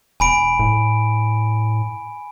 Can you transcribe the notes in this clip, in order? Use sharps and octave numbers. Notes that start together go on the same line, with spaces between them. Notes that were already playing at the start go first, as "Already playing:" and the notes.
E1 G#5 B5 D7
A2